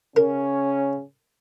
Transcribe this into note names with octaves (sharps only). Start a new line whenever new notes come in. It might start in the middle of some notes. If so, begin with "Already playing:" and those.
C#3 C#4 A#4